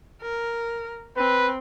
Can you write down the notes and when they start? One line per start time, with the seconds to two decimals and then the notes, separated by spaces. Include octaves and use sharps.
0.22 A#4
1.17 C4 B4